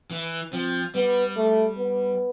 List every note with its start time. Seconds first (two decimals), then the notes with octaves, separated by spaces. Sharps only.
0.11 E3
0.52 F3 C4
0.95 G3 B3
1.37 A3
1.78 B3